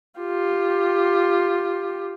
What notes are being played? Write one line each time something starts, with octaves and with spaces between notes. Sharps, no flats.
F4 G4